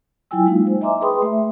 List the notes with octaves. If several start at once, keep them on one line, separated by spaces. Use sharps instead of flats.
F#3 E4 F4 G5 G#5 E6
G#3 A#3 D#4 F4 F5
C5
D#5 E5 G#5 A#5 C6 D6
G#4 B4 G5 B5 C6 D#6
A3 E5